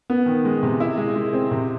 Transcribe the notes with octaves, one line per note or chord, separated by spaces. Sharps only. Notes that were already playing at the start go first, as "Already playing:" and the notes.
B3
D#3
G#3
C3
E4
G#3
G#3
C4
C3